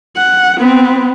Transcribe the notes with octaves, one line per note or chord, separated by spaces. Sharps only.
F#5
B3 C4